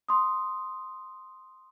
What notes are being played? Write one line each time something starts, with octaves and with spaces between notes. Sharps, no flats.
C6 D#6